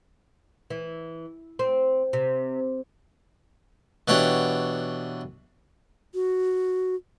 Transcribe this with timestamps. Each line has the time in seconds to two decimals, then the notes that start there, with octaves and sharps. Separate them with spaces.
0.70 E3
1.59 C4
2.13 C3
4.08 B2 E3 D4 G4 C#5 F#5
6.15 F#4